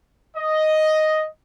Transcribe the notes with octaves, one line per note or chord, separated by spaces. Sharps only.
D#5